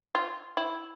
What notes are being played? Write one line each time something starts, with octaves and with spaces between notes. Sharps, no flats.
F4
E4